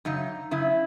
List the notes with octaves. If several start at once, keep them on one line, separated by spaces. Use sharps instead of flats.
F#2 C#3 D#4
F#2 C#3 E4